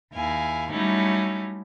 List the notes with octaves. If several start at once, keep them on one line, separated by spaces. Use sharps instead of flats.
D#2 E4 F5 G#5
F#3 G3 A3 C#4 D#4 E4